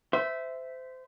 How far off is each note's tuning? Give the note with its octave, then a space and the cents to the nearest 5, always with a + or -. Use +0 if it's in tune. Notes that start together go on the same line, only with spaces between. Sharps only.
C5 -25 E5 +0